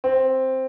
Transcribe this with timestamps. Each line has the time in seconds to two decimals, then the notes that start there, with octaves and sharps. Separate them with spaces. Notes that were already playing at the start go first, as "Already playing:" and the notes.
0.04 C4